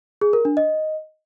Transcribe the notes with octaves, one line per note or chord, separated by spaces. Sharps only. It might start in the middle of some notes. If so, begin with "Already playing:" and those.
G#4
A#4
D4
D#5